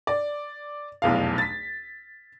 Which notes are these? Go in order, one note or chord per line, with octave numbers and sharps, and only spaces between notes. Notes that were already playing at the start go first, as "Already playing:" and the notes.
D5
F1 B1 E2 F5
A6 B6